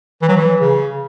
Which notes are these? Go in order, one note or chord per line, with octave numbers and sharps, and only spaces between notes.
E3
F#3
E3
C#3